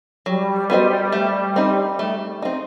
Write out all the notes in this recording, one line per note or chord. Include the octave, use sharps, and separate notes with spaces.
F#3 G3
B3 F#4 C5 D#5
A3
C4 D#4
A3
C4 D#4